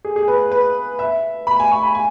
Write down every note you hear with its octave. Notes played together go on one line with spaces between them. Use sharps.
G#4
G#4
B4
B4
E5
B5
G#5
C#6
B5
G#5